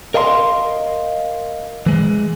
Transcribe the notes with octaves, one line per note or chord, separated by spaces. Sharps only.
A#4 D#5 F5 G#5 C6
E3 G#3